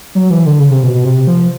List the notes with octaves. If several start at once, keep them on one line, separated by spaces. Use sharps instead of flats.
F#3
E3
D3
C#3
C3
B2
B2
C3
F3